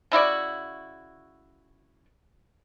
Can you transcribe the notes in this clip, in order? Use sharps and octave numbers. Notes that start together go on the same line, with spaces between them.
C#3 E4 F#4 D5